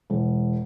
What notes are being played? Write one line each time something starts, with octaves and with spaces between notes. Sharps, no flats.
E1